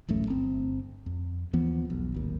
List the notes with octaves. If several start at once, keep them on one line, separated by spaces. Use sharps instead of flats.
D1 A1 F#2 A3
G1 C4
F2
D#2 E3 F3 B3
E1 B1
D1 G#1 D#2